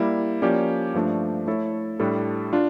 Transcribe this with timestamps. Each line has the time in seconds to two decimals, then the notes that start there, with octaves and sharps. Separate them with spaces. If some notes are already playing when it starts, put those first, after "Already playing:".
Already playing: G3 A#3 E4
0.42 F3 A#3 C#4 G4 D5
0.94 G2 F3 A3 D4
1.47 A3 E4 A4 C#5
2.00 A2 G3 D4 A4
2.53 D4 F4